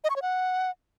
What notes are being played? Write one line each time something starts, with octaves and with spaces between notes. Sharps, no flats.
D#5
C#6
C#5
F#5